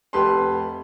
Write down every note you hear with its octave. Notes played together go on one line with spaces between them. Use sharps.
F1 G4 B4 A5 C6